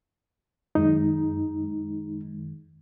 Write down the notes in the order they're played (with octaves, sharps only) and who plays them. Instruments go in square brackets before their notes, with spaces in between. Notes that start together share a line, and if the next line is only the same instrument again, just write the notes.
[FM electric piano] F#2 D#3 G#3 [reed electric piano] D#4